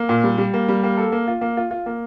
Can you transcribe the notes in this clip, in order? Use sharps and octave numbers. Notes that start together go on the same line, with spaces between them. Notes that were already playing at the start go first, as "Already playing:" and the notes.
Already playing: A#3
A#2
G3
G3
A#3
G3
A#3
A4
A#3
F4
A#3
F4
F4
A#3